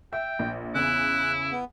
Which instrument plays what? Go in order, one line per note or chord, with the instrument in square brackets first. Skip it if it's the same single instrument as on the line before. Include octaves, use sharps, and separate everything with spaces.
[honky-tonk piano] E5 [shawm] G5
[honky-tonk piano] A#1
[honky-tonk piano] E2 C#3 [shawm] E4 [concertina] F#6
[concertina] B3